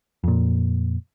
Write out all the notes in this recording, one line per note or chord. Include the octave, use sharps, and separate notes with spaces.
F2 A#2